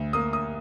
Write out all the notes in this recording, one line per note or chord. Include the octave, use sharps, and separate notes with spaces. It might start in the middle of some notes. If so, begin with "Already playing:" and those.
Already playing: D2
A#3 D#6
D#6